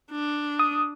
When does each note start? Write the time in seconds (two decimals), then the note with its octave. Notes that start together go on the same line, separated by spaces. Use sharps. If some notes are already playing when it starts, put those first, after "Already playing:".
0.11 D4
0.59 D#6